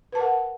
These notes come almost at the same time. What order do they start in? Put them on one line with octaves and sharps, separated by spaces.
B4 A5 A#4 F#5